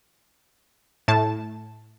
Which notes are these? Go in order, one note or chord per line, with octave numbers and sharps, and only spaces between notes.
A2 A5